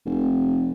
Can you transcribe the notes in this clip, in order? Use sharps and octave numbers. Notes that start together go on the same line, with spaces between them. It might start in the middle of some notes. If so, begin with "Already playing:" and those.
F1